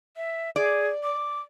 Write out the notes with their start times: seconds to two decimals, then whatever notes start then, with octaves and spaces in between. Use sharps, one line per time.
0.17 E5
0.56 G#4 D5
1.03 D6